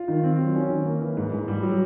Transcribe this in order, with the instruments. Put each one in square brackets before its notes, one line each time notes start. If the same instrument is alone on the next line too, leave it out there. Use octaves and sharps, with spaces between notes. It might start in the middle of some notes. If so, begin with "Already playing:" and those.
Already playing: [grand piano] F4
D#3
C4
F#3
C#4
D#3
A#3
E3
G#2
G#2
G3
F#3